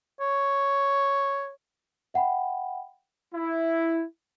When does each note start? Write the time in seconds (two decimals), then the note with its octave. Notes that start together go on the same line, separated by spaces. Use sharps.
0.20 C#5
2.14 E5 F#5 G5 B5
3.34 E4